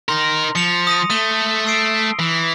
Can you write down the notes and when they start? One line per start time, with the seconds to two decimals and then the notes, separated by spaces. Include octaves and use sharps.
0.09 D#4 A#4 C6 A#6
0.55 F3 C#7 F7
0.87 D#6 A#6 D#7
1.10 A3 D#7 G7
1.67 E6 C7 D7
2.19 E3